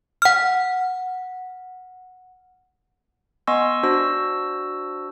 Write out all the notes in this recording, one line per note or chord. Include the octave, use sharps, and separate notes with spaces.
F#5 F6
B3 D#5 G#5 C6 C#6 E6
D4 F#4 C5 E6 A#6